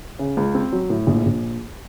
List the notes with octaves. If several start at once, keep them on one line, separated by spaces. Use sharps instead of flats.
C#3
C#2
C4
F#3
A2
A#1
A#1